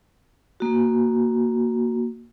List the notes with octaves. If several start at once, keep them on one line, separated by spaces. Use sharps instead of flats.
A#3 F#4